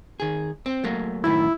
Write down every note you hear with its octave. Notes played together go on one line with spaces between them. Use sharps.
D#3 G#4
C4
F#3 A3 A#3
F#2 A2 D#3 E4